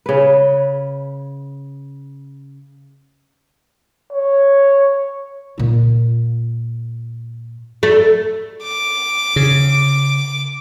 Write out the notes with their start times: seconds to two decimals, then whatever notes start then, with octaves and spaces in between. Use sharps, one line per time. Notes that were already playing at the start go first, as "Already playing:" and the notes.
0.06 C#3 B4
4.12 C#5
5.58 A#2 F4
7.83 A3
8.64 D6
9.36 C#3